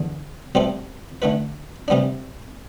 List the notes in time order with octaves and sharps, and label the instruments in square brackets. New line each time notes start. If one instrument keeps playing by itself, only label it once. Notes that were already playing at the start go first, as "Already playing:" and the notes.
Already playing: [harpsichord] E2 D3
B2 G3 C4 E4 A4
D3 A3 E4 B4
C3 G3 B3 D4